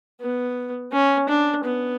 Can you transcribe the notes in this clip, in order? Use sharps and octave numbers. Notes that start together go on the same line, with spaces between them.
B3
C#4
D4
B3